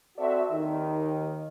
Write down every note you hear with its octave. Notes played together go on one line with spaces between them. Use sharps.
C4 F#4 A4 D5 E5
D#2 D#3 D#4